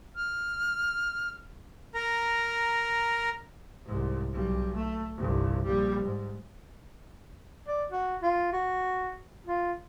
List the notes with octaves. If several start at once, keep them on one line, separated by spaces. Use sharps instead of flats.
F6
A#4 A#5
C2 G#2
B1 G3
A3
G1 C2
A#1 G3
G#2
D5
F#4
F4
F#4
F4